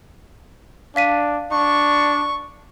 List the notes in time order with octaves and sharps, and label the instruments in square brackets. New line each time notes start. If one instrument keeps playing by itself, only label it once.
[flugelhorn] D4 [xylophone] F5 B6 D#7
[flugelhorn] D4 [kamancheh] C#6